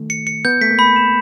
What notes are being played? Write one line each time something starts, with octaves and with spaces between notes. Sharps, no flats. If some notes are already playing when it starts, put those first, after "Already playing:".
Already playing: D#3 A3
C#7
C#7
B3 G6
A3 B6
A#3
B5
E7